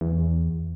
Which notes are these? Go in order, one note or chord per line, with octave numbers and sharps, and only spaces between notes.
E2